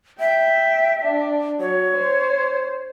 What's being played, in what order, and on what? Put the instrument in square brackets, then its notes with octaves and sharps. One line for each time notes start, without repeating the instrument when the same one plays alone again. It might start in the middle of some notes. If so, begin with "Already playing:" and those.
[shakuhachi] E5 [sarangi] G5
[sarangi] D4
[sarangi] F#3 [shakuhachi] C#5
[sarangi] C5